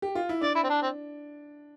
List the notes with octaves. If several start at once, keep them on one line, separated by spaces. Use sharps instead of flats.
G4
F4
E4
D4 D5
E4
C4
D4
C4